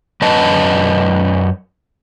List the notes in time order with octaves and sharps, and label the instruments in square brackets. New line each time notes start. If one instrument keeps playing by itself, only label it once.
[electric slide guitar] F#2 C#4 B4 D#5 A5